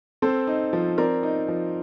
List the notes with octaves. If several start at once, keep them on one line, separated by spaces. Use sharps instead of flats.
C4 A4 C5
D#4
F3
C4 A#4 D5
D#4
F3